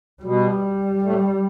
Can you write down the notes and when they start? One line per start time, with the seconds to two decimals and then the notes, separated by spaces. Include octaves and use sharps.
0.22 B2 G3
1.02 A2